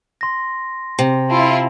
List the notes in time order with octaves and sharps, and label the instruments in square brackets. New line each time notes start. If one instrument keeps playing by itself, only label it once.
[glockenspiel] C6 A#6
[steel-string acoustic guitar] C3
[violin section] E4 F4 [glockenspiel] A5